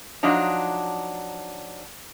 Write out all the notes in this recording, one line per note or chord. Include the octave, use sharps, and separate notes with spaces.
F3 F#3 D4 D#4